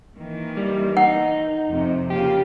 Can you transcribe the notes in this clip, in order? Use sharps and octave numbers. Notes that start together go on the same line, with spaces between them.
D#3 E3 A#3
G3
D#4 F#5
F2 C3
C#3 A#3 F4 G4